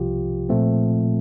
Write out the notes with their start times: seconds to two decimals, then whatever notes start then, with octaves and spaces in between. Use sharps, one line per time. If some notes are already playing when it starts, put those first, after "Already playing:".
Already playing: C2 C3 F3 F4 G4
0.49 A#2 F3 A3 C4